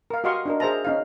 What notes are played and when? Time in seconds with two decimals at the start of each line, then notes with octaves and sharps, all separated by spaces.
0.10 A#4 F5
0.24 F#4 G4 D#5 F5 C6 C#6
0.46 D4 D#4 A#4
0.60 G#4 A#4 C5 E5 A5 A#5
0.85 C#4 D#4 F5